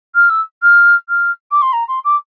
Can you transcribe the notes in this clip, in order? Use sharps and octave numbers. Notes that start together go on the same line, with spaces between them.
F6
E6
F6
F6
D6
C6
A#5
C6
D6